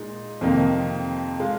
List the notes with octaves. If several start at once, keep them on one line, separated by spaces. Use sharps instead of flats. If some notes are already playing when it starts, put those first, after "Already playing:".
Already playing: A#2 G#3 D#4
F2 C3 D#3 A#3 D#4
G#3 F4